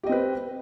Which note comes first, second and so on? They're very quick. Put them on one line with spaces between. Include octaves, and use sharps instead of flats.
G4 D#5 C4 B4